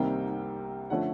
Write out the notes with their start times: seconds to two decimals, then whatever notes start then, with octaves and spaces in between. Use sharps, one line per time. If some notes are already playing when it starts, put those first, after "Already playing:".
Already playing: C2 C3 D#3 G3 A#3 G5
0.90 D3 F3 A3 C#4 F#5